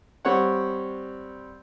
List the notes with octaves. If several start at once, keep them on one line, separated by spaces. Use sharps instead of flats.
G3 C4 C#5 F#5